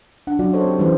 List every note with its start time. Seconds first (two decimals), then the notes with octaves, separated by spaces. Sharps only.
0.27 D4 F#5
0.39 F#3 C#4 D4 F4 F#4 D5
0.53 F4 A4 C5 C#5 D#5
0.64 C4 G4
0.79 E3 G3 C#4 G4 B4 C5